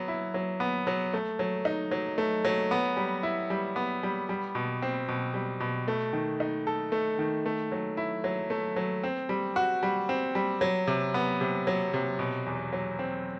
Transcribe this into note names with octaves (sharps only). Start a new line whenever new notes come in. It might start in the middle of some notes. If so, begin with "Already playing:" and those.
Already playing: F#3 B3
E4
F#3
B3
F#3
A3
F#3
D#4
F#3
A3
F#3
B3
G3
E4
G3
B3
G3
G3
B2
C4
B2
G3
B2
A3
D#3
D#4
A4
A3
D#3
A3
F#3
E4
F#3
A3
F#3
C4
G3
F#4
G3
C4
G3
F#3
C3
B3
C3
F#3
C3
B2
E2
F#3
C4